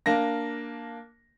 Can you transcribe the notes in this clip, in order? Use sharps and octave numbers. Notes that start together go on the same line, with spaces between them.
A#3 D4 A#6